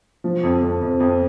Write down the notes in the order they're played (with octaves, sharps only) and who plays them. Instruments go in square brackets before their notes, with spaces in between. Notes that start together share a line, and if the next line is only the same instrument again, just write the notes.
[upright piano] F3
F2
F2
F2
F2